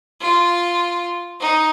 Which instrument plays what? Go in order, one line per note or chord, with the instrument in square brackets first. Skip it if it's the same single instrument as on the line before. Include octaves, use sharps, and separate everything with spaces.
[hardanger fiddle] F4
D#4